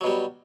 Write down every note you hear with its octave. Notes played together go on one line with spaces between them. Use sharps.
B2 F#3 G3